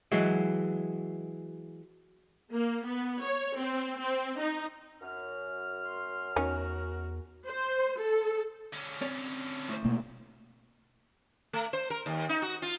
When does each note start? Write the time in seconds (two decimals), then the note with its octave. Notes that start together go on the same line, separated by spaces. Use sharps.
0.12 E3 F#3 G#3
2.51 A#3
2.85 B3
3.23 C#5
3.56 C4
3.99 C4
4.38 D#4
5.01 F#2 F6
5.87 C6
6.36 E2 D#3 C#4 F#4 A#4
7.46 C5
7.99 A4
8.73 D3 C#4
9.01 C4 C#5 D5
9.69 A2 C5
9.85 B2 A3 A#3
11.53 A3
11.73 C5
11.90 A#4
12.06 D#2
12.29 D#4
12.42 F#4
12.62 F4